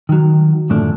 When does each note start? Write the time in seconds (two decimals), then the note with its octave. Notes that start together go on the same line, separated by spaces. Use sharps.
0.09 D#3 F#3
0.70 F#2 A2 D3 F3 A3 D4